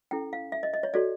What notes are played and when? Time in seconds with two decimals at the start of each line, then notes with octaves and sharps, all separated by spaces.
0.11 C#4 E4 A4 G5
0.33 F5
0.52 E5
0.63 D#5
0.74 D#5
0.83 C#5
0.94 F#4 A4 C#5 D5